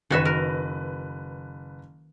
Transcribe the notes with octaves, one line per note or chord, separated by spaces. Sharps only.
F#1 D#3 F#4 B4 E5
A#4